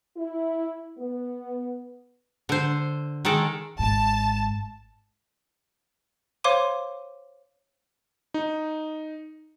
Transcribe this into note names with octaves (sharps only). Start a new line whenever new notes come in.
E4
B3
D3 C5
D#3 G#3 A4 D5
G#1 G#2 A5
C5 C#5 F5 C6 D6 D#7
D#4